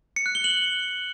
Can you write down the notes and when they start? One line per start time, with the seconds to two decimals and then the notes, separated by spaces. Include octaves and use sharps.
0.16 C#7
0.26 F#6
0.35 G7
0.44 F#7